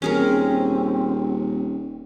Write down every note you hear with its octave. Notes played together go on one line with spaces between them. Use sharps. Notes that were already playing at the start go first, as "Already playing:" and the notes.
D#1 C4 C#4 G#4 A#4